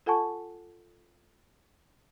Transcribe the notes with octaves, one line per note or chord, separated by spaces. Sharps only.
F4 A4 F#5 G#5 A5 C#6